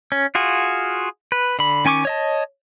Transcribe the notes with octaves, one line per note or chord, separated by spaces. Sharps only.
C#4
F4 F#4 G#4
B4
D3 B5
D#3 C#4 G#5 C#6 D6
C#5 D#5 A5